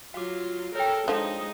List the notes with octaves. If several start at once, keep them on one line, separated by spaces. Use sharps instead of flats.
F#3 F4 F5 D6
A4 A#4 C#5 G5
D3 F3 G#3 D#4